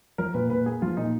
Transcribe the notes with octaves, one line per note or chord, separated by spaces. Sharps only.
F3 A#4
A#2 B4
A#2 B4
A#3 G#4
F3 F4
A#2 D#4